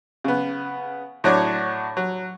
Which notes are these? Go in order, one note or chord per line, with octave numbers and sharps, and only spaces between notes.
C#3 B3
A2 F#3 D4 C#5 A5 D6
F#3